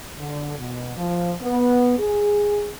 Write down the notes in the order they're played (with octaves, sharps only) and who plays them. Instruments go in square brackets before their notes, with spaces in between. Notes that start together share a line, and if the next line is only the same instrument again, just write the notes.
[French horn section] D3
B2
F3
B3
G#4